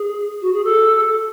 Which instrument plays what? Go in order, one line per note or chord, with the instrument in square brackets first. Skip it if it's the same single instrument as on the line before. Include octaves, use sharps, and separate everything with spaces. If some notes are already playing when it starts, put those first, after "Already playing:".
Already playing: [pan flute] G#4
F#4
G#4
A4